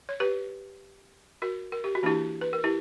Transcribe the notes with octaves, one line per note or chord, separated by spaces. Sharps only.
C#5
G4 B4
F#4 A#4
A#4
G4
F#4
E3 A#3 D4 E4 G4
B4
A#4
E4 G4